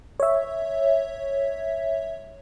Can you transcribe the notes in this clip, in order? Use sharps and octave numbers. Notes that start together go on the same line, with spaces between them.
C#5 E5